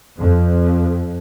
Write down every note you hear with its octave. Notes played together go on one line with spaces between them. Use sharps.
F2